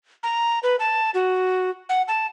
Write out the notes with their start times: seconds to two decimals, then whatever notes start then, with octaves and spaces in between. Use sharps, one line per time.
0.23 A#5
0.63 B4
0.80 A5
1.14 F#4
1.89 F#5
2.08 A5